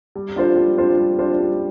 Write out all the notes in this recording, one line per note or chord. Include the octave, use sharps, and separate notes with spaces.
G3
D4 F4 C5
G3
D4 F4 C5
G3
D4 F4 C5
G3